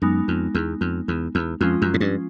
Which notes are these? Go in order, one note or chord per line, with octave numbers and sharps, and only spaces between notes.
F#2 G#3 B3 D#4
F2
E2
F2
E2
E2
F2 F3 G#3 C#4 F4
F#2
G#2
G2